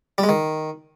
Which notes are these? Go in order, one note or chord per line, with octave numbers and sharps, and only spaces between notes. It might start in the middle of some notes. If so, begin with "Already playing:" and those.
G3
G#3
D#3